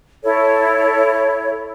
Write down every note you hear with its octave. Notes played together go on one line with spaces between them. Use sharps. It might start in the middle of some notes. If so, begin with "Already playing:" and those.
E4 A4 C#5